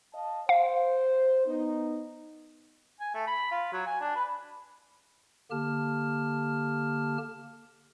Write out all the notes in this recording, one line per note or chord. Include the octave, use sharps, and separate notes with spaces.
D#5 F5 A5
C5 F5
B3 D#4
G#5
A3
B5
F4
F#3
G#5
D4
B4
D3 A#3 G4 A5 F6